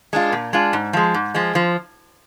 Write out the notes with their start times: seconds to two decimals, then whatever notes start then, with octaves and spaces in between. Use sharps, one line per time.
0.13 G#3 D4 F4
0.32 A#2
0.53 G#3 D4 F4
0.73 G#2
0.93 F3 G#3
1.14 G#2
1.35 F3 G#3
1.55 F3